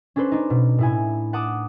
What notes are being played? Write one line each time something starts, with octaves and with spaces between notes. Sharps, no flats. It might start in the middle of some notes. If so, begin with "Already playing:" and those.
C#4 D4 A4 B4 C5
D4 D#4
B2
A2 E4 G#5
F#5 A5 D6 D#6